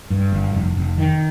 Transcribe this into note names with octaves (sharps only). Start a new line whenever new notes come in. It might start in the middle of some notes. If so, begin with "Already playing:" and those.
G2
G1
F1
F1
D#3